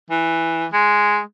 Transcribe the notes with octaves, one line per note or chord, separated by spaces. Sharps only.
E3
G#3